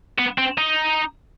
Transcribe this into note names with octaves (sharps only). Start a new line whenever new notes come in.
B3
C4
D#4